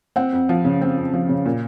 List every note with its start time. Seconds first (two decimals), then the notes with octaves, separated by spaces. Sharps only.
0.16 C4 F#5
0.32 F2
0.49 F3
0.65 C#3
0.81 C4
0.97 F2
1.13 F3
1.29 C#3
1.46 A#2